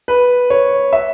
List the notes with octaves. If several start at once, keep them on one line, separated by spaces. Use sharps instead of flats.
B4
C#5
E5